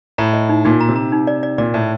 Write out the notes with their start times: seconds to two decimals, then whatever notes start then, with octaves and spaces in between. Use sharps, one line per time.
0.18 A2 A#5
0.34 D#5
0.49 D#4
0.65 A#2 D#4
0.81 A#5
0.89 C3
0.96 A#5
1.12 D#4
1.27 D5
1.43 D5
1.58 A#2 D5
1.74 A2 D5